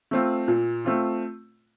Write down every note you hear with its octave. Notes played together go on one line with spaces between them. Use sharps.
A3 C4 F4
A#2
A3 C4 F4